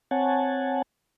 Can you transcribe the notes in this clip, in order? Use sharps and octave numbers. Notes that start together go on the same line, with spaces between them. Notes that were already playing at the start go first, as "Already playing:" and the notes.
C4 C#5 F#5 G#5 A5